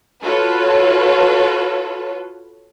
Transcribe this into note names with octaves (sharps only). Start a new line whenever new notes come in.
F4 F#4 A4 B4 C#5